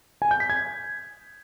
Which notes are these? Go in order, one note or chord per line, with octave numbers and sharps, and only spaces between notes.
G#5
G6
B6
G#6